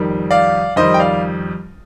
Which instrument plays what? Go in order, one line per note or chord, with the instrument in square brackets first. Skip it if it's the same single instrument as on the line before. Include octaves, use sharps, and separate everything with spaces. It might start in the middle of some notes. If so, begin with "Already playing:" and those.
Already playing: [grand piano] F2 D#3 G3
D5 F5
F2 D#3 G3 C5 D#5
G5
D5 F5